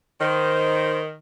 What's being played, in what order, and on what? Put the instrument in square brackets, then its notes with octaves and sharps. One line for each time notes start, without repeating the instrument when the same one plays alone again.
[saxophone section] D#3 [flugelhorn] C5